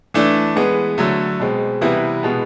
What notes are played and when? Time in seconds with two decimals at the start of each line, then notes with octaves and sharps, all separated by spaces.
0.14 E3 A3 D4
0.56 E3 G#3 B3
0.98 D3 F#3 A3
1.40 B2 G#3 C4
1.81 C3 E3 G3 B3 E4
2.23 B2 G#3 B3